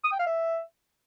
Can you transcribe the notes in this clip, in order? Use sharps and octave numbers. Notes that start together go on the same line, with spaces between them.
D#6
G5
F5
E5